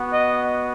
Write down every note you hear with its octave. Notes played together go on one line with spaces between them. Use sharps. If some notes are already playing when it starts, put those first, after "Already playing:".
Already playing: B3 F#4
D#5